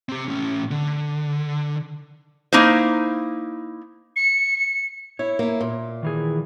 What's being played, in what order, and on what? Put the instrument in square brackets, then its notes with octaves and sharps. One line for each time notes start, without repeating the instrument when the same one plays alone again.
[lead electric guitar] C4 G4
A2 C#4
D3
[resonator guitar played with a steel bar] A#3 D#4 E4 C5
[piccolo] C#7
[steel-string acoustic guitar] E4 [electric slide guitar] C#5
[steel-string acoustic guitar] A#3 E4
A#2
[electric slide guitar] D#3 E3 G#4